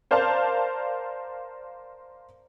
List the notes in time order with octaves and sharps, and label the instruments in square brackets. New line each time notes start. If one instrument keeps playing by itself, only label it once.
[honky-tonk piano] A#4 C5 D5 F5 A5